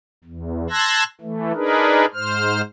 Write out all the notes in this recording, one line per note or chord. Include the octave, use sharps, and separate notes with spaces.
E2
A5 C6 E6 F#6 G#6 A#6
E3 A3
D4 D#4 G#4 A#4 B4
G#2 C5 F6